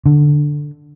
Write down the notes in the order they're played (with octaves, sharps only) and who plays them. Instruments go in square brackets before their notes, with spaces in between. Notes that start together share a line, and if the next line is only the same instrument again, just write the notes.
[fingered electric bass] D3